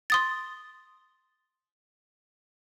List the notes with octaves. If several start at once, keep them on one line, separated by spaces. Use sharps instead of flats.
C6 D#6 A6